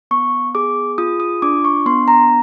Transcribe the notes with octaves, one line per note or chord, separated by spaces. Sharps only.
B3 C#6
G#4 D6
F4 D#6
D#6
D4 D6
C#6
B3 C6
A#5